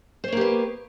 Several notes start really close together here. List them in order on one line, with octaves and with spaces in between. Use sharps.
C5 C#5 A#3 G4 B3